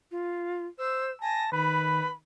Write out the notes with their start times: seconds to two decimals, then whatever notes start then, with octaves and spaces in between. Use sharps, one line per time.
0.11 F4
0.78 C5 E6
1.22 G#5 A5 A#6
1.52 D#3 B4 B5